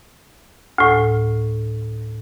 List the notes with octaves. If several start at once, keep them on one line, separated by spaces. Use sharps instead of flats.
D2 A2